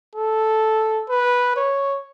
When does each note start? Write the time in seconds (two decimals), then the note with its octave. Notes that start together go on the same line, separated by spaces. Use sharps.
0.16 A4
1.10 B4
1.57 C#5